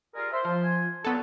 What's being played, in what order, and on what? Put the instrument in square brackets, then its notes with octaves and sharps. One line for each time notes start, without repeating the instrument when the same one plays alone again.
[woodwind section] G3 F4 G#4 [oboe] A#4
[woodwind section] C5 C6 [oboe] E5
[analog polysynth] F3 [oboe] F4
[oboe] G#5
[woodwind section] A#2 C#3 F#3 [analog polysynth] B3 A4 [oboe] A5